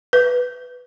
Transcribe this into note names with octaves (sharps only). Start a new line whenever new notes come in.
B4